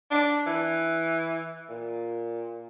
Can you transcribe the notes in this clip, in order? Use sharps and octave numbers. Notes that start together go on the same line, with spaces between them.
D4
E3
A#2